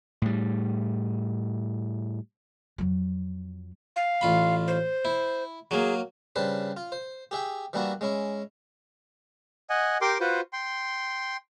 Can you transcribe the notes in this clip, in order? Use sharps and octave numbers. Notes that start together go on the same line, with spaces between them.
A2 G3
F2 F#3
F5
A1 F4 B5
C5
E4
F#3 A#3 G#4
C#3 G3 D4 B4 C5
F4
C5
G4 G#4 E5 G5
E3 G3 A#3 D4 E4 F#4
G#3 C#4 E4
D#5 F#5 G#5
G4 A#4 G5 C6 D6
F4 F#4 B4 C5
G5 C6